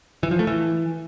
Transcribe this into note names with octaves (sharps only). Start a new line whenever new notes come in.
E3
F3
A3
E3